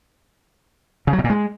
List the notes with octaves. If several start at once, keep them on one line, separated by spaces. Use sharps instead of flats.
C#3
F#3
B2
A#2
G#3